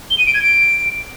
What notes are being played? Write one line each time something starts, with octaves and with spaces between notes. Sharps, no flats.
G7
D#7
D7
G#6
D7